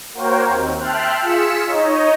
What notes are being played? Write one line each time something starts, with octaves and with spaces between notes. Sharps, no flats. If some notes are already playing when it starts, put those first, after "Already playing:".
A#3 F#4 A#4 C5 C#5 G5
D#2 C4
E5 G5 A5 C6 F6 F#6
F4 G#4 E6 B6 C#7 E7
D#4 C#5 D#5